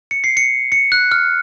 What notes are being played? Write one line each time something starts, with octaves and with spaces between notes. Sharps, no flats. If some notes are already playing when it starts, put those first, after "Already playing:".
C#7
C7
C#7
C#7
F#6
F6